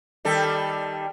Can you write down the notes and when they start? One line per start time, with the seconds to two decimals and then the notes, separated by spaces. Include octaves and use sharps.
0.25 D#3 G3 A4